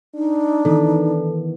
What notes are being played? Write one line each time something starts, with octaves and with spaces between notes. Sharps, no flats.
D4 D#4
D#3 E3 B3 A4